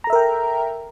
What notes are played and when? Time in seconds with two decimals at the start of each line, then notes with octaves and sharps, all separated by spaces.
0.04 A#5
0.07 A4
0.10 E5
0.13 A#4
0.15 G5